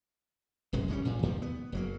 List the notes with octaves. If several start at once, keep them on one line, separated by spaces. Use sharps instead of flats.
D1 B1 F#2 G#3
G1 C#3 G3 C#4
A#1 A#2
E2 A#2 D#3 F3
B3
F#1 F#3 A#3